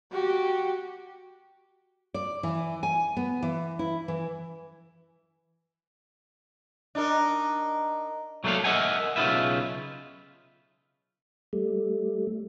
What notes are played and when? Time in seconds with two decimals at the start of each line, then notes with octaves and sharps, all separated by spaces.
0.12 F#4 G4
2.14 D5
2.43 E3
2.83 G#5
3.17 B3
3.42 E3
3.79 E4
4.08 E3
6.95 D4 D#4 A#4
8.44 F#3 A3 A#3 D4 A4 F5
8.64 A#4 C5 D#5 E5 F#5 G#5
9.16 B1 C#3 D#4 F4 B4 E5
11.53 G3 A3